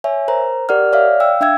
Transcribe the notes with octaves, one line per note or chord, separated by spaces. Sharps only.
C#5 E5 G#5
A#4 C5 A#5
G4 A#4 D5 F#5 F6
C#5 D5 E5 F5 F6
F5 G5 E6
D4 E5 G5 E6 G#6